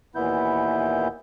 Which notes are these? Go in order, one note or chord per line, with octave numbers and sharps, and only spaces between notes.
D#2 A#2 E3 B3 E4 G6